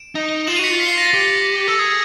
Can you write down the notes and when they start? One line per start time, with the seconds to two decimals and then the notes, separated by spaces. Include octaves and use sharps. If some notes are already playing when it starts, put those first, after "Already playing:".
Already playing: D7 E7
0.15 D#4
0.47 F4 E7 F#7
0.56 D#7 F7
0.59 F#4 B6 C#7
0.71 F4
0.80 B6 C#7
0.88 C7
0.98 A#6
1.06 A6
1.14 G4
1.68 A4 A6
1.79 G#4 G#6